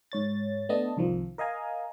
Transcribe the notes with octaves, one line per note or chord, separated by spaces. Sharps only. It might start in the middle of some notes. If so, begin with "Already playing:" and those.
G#2 C#5 A6
A3 B3 D4 D#5 A5
C2 F2 D#3 F3
A#4 D#5 F5 G#5 A#5